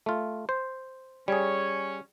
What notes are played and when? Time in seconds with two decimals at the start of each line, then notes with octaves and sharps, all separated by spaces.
0.06 A3 F4
0.49 C5
1.28 G3 C#4 G#4 C#5